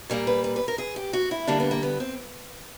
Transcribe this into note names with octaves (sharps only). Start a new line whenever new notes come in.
A#2 G3 A#3 A#4
B4
B4
B4
A#4
G#4
G4
F#4
E4
D3 G3 A#3 D4
B3
A#3
B3
C4